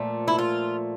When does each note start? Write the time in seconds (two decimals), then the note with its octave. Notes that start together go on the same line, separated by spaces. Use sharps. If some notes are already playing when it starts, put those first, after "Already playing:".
Already playing: A#2 F3 A3
0.28 E4
0.38 F4